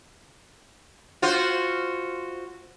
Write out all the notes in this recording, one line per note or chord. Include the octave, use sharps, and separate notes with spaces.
F4 F#4 C5